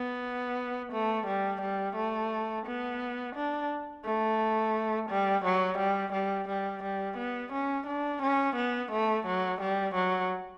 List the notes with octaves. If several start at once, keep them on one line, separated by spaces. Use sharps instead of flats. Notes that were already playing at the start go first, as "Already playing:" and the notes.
Already playing: B3
A3
G3
G3
A3
B3
D4
A3
G3
F#3
G3
G3
G3
G3
B3
C#4
D4
C#4
B3
A3
F#3
G3
F#3